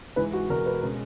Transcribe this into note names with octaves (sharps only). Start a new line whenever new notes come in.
G#2 E3 G#3 B4
F#4
E2 B2 G#3 A#4
B4
B2 G#3 C#4 A#4